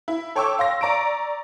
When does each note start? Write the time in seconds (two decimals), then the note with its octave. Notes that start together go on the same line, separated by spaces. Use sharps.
0.08 E4
0.36 A4 C#5 G5 C#6 D6 E6
0.59 F5 C6 A#6
0.81 D5 A#5 C#6 D7